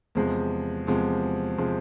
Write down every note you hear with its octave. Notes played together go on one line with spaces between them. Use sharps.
E2 C3 F3 G#3
E2 C3 F3 G#3
C3 F3 G#3